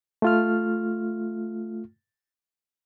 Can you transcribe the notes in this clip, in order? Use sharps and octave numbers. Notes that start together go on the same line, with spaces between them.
A3 F4 F6